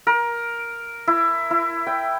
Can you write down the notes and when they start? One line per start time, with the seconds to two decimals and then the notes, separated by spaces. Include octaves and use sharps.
0.07 A#4
1.07 E4
1.51 E4
1.87 G5